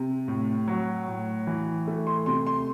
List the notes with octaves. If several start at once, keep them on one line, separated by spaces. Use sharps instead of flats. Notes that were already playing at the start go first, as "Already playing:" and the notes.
Already playing: C3
A2
F#3
A2
E3
A3
C6
C3 C6
C6